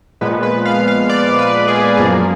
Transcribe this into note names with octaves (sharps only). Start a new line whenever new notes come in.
A#2 F3 G#3 B3 B4
B4
F5
F5
D5
B4
G#4
F#2 F3 A#3 G#4